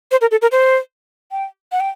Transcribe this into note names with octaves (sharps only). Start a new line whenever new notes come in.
C5
A#4
A4
A#4
C5
G5
F#5
G5